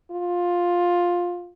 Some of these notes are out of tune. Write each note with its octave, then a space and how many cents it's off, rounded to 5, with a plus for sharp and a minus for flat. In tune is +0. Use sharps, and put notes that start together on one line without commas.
F4 +10